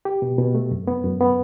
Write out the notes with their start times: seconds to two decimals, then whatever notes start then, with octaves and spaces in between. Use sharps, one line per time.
0.05 G4
0.22 B2
0.38 B2
0.55 A3
0.71 F#2
0.87 B3
1.04 F#2
1.20 B3